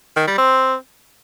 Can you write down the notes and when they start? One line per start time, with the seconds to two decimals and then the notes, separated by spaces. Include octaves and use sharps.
0.16 D#3
0.27 G3
0.38 C4